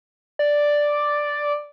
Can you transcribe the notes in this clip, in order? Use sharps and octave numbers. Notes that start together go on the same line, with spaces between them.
D5